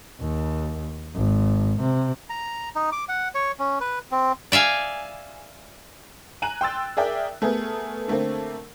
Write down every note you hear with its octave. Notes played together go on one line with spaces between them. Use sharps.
D#2
G#1
C3
A#5
D#4
D6
F#5
C#5
C#4
B4
C4
D5 E5 F5 G#5
G#5 A#5 F#6 D#7 F#7
G5 C6 E6 A6
G#4 A#4 D5 E5 G5
A3 B3 G#4 A#4
D3 A3 A#3 C4